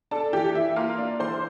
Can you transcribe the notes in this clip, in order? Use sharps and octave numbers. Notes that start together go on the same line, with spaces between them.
D4 A4 A5
E3 G4 G5
E3 E4 E5
A#3 F4 F5
D4
E3 C5 C6